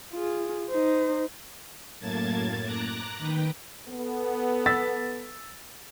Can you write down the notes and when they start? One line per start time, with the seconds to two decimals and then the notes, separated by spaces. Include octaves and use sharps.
0.13 F4 G#4
0.70 D#4 C5
2.00 F#2 A2 A#3 A5 G#6 A6
2.64 A#5 D6 F#6 A#6
3.18 D#3 B4 G5
3.89 B3 A4
4.66 E6 A6 B6